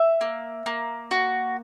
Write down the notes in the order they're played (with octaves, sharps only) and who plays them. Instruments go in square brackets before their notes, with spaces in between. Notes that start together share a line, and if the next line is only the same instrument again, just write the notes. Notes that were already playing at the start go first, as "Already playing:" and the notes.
Already playing: [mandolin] E5
A#3
A#3
F#4